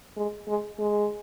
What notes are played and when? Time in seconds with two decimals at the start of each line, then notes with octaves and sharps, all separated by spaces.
0.17 G#3
0.48 G#3
0.79 G#3